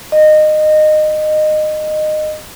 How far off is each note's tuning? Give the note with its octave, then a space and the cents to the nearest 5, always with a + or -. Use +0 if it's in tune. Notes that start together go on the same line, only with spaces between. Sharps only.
D#5 -20